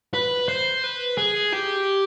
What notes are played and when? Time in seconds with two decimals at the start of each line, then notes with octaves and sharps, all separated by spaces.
0.14 B4
0.48 C5
0.84 B4
1.18 G#4
1.53 G4